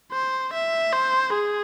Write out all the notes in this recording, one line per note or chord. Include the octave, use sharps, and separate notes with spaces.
C5
E5
C5
G#4